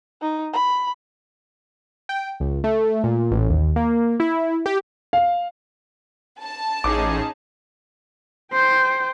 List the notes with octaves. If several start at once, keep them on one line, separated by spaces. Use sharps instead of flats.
D#4
B5
G5
C#2
A3
A#2
A1
D#2
A#3
E4
G4
F5
A5
A1 C#4 D#4 G#4 D6
C5 G5